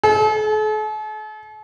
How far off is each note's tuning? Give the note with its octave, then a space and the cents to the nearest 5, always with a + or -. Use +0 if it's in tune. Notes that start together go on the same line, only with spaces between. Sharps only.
A4 -45